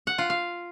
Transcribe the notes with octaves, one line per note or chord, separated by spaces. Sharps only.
F#5
F4
F5